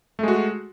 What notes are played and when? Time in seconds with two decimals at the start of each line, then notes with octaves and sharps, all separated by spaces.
0.19 A3
0.23 G#3
0.28 F#4